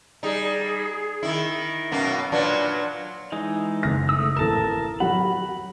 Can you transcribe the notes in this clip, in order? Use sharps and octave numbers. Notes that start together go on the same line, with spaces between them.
G3 D#4 G#4
D#3 E4
F#2 B2 A#3 F5
A#2 F#3 D4 B4
E3 G#3 D#4
F#1 A#6
A3 D#6 E6
A1 A4 A#4 A5 E7
F#3 G4 F#5 B5